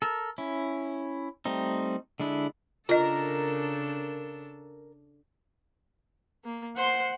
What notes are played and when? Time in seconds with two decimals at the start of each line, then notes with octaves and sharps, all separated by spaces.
0.02 A4 A#4
0.38 C#4 E4
1.45 G3 A3 C4 D#4
2.20 D3 G#3 D4 E4
2.89 C#3 D4 F4 A4 A#4 D#5
6.44 A#3
6.77 C5 F#5 C6